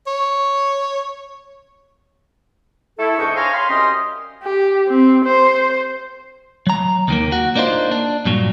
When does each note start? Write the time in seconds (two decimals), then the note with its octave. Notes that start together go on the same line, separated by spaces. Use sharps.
0.07 C#5
2.99 A3 E4 A4
3.18 E2 G#2 D4 D#5 G5 C#6
3.36 C5 C#5 F5 G#5 A#5 C6
3.53 F5 G5 B5 C6
3.69 C2 F#2 C#4 G4 D#5 C6
4.43 G4
4.88 C4
5.25 C5
6.67 F#3 A#5
7.08 D#2 D#3 A#3
7.32 F#4
7.55 A#3 D4 D#4 F4 C5
7.91 D4
8.25 G2 A#2 F#3